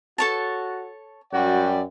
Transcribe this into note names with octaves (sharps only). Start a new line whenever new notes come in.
F#4 A4 C#5 A5
F#2 F#4 D5 G5